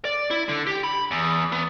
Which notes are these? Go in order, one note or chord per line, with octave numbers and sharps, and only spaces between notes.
D5
E4
D3
G4
B5
E2
B3